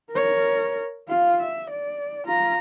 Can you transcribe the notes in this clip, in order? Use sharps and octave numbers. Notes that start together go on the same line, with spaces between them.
A#4 C#5
F4 F5
E5
D5
F4 A#5